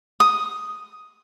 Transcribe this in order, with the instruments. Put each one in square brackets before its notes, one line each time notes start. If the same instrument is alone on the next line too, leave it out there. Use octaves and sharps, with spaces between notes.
[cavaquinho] D#6